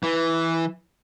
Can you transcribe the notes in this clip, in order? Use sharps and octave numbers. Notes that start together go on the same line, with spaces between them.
E3